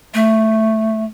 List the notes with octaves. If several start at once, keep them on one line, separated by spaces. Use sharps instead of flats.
A3